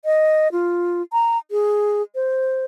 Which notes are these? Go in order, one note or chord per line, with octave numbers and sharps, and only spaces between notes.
D#5
F4
A#5
G#4
C5